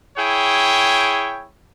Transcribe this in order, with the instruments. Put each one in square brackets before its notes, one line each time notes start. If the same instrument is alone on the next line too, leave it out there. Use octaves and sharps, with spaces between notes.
[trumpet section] E4 G#4 C#5 G5